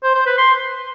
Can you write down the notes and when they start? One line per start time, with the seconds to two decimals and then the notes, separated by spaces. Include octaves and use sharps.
0.04 C5
0.15 C5
0.27 B4
0.38 C6